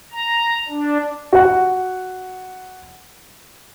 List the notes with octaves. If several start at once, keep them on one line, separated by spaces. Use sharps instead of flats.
A#5
D4
F#4 F#5